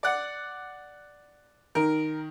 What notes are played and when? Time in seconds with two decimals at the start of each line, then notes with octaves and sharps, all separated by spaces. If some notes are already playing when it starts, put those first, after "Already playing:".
0.03 D5 F#5
1.75 D#3 A#4